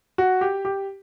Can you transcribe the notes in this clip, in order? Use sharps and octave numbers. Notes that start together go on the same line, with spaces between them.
F#4
G4
G4